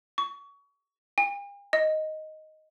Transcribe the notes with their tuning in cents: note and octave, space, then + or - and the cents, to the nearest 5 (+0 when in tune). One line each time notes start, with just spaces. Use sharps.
C#6 +25
G5 +45
D#5 +5